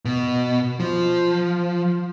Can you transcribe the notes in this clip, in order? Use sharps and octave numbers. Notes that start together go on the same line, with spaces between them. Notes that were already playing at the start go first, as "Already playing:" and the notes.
B2
F3